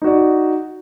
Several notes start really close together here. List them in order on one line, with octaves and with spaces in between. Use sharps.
D#4 F#4 D5